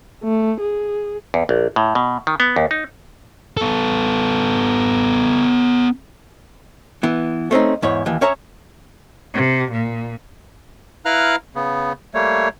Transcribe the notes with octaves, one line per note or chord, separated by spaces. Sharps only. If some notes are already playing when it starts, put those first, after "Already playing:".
A3
G#4
E2
A#1
A2
B2
D#3
B3
D#2
D#4
B3 A4
E3 B3
A3 C4 C#4 D#4
E2 G#2 E4 C#5
D#2 E3
C#4 C#5 E5 A#5
C3
A#2
E4 B4 F5 A#5 F6 F#6
C#3 B3
G3 A3 A#3 C#5